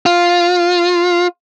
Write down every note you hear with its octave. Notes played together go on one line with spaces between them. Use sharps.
F4